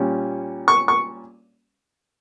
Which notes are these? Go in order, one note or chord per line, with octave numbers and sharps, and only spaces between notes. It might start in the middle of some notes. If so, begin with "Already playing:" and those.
Already playing: A#2 G3 C#4
C#6
C#6